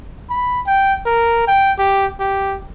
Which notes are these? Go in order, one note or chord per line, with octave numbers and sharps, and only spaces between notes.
B5
G5
A#4
G5
G4
G4